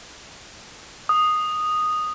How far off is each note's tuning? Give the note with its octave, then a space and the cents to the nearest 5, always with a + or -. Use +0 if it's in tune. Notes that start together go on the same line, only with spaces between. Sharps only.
D#6 -5